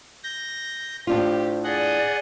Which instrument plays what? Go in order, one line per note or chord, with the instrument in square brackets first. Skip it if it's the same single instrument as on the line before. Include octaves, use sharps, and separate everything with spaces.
[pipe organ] G6 A#6
[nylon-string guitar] A2 D4 F4 [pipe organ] G4 [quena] C5
[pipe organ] G#4 D#5 F#5 [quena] D5